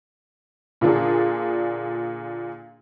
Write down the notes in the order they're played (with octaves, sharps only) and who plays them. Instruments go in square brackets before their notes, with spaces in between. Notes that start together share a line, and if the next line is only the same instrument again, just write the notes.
[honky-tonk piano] A#2 D3 D4 G#4